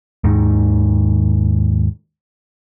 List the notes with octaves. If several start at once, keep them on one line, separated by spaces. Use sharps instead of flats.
D#2 G#2 D#3